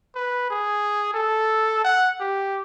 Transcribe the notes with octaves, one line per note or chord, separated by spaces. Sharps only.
B4
G#4
A4
F#5
G4